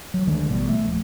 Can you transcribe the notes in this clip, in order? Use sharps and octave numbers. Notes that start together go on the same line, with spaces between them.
F#3
D2 D#3 G#3 D4
A1 B2 G3 B3
A3
D#1 F3